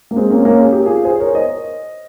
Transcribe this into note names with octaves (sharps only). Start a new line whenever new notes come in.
A#3
G#3 C4
A#3 C#4
A#3 C#4
G#4
G4
F4 G#4
G#4 C5
A#4 C#5
C5 D#5